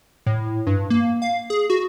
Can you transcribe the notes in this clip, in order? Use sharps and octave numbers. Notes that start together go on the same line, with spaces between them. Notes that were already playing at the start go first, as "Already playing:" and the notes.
A2
G2
A#3
F5
G#4
F#4